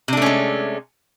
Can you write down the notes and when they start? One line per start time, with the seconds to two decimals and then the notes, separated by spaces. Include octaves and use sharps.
0.08 C3
0.13 D4
0.17 A3
0.22 C#4
0.26 G#3